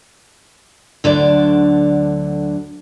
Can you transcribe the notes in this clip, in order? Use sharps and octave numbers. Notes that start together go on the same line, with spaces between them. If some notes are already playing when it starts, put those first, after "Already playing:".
D2 D3 F#3 D4 D5